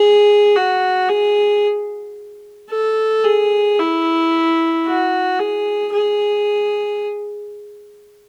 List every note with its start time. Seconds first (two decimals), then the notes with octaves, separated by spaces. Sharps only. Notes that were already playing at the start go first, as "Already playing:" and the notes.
Already playing: G#4
0.56 F#4
1.09 G#4
2.70 A4
3.24 G#4
3.79 E4
4.86 F#4
5.39 G#4
5.93 G#4